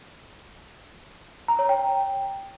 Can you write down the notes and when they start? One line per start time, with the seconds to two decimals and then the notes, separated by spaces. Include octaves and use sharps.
1.48 A#5
1.59 C#5
1.69 G5